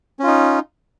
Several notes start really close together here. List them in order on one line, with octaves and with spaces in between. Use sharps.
C#4 F4 D#4